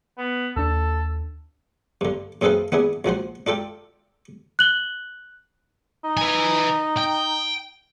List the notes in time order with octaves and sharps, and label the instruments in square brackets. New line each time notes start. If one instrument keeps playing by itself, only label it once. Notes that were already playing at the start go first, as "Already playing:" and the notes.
[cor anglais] B3
[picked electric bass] D#2 D4 [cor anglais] A4
[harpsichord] G2 D3
F#2 C4 G#4 A4 B4 F5
B3 D4 E4 G#4
A#1 F3 F#4 C5
D4 F4 A4 G5
[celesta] F#6 F#7 G7
[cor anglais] D#4
[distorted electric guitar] B4 G#5
G5